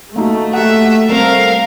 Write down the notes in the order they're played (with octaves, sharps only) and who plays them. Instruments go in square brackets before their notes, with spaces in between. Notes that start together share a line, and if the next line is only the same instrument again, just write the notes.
[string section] A3 [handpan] A#3 D#4 F#4
[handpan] G4 F#5 [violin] E5
[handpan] G3 C4 [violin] A#4 F5